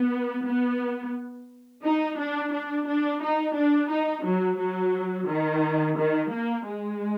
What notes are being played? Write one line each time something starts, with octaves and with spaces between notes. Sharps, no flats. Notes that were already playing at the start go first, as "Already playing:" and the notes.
Already playing: B3
B3
D#4
D4
D4
D4
D#4
D4
D#4
F#3
F#3
D#3
D#3
A#3
G#3